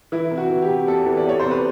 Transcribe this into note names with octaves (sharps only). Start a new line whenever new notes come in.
E3 E4
C3
F#4
E3
G4
C3
E2 A4
E3
D5
E2 C#5
C3 C5
B4